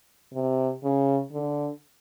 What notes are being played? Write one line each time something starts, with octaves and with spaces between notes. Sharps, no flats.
C3
C#3
D3